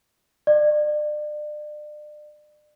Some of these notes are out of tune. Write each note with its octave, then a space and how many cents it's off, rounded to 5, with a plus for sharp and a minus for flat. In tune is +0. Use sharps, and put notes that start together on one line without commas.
D5 +35